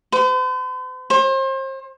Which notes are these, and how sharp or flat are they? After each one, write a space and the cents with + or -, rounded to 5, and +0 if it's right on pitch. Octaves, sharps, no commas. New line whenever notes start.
C5 -45
C5 +35